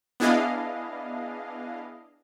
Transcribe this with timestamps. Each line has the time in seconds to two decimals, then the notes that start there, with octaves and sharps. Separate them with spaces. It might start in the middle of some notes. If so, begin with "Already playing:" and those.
0.20 B3 D4 E4 G#4 D#5 F5